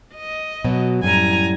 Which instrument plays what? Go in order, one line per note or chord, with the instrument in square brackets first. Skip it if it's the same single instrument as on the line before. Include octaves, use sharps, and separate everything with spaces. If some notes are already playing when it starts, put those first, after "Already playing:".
[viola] D#5
[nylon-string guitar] B2 F#3
[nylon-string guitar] F#2 A2 G3 [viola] G#5 A#5